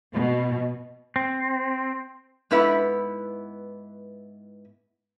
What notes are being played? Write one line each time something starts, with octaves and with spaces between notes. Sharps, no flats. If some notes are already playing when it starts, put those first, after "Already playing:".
B2
C4
G#2 B3 E4 B4 E5